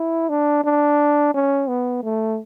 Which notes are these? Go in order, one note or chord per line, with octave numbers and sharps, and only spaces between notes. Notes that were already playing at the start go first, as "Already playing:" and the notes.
Already playing: E4
D4
D4
C#4
B3
A3